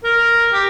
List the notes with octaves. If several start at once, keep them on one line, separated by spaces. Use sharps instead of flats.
A#4
G4